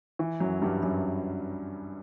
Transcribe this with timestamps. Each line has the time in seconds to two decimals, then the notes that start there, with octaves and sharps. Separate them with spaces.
0.19 E3
0.40 F#2 F#3
0.62 G2 G3
0.83 F#2 F#3